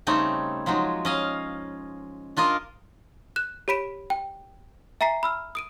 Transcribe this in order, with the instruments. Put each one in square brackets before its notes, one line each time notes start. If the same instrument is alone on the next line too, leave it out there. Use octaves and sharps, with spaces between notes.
[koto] C#3 G3 A3 C4 D#4 C#5
F3 F#3 G#3 D#4
C#4 D#5 F5
D4 F4 A#4 D#5
[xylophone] F#6 E7
G4 C#5 B5 B6 D7 E7
G5
E5 G#5 A#5 B6 C7
B5 E6 F6
D#6 D7 D#7